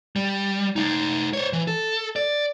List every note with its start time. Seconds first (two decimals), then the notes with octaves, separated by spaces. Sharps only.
0.16 G3
0.76 A3 D#4
1.33 C5 C#5
1.53 E3
1.67 A4
2.16 D5